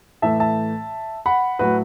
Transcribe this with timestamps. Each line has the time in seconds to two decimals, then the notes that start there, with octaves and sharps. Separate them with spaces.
0.22 A2 E3 A3 E5 A5
0.40 E5 A5
1.26 F#5 B5
1.59 A2 F#3 A3 F#4 B4